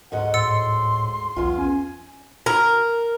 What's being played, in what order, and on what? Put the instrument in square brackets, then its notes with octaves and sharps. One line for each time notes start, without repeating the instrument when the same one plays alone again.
[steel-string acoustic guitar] D2 G#2 D#5 [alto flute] F#5
[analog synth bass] A2 [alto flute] C6 [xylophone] E6 A6 C#7
[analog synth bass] B1 [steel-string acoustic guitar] E2 F4
[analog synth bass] C#4 [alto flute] G#5
[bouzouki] A#4